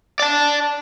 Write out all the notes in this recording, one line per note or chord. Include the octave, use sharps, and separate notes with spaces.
D5 A5